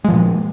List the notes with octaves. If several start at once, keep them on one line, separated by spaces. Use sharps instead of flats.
A#2 F3 G#3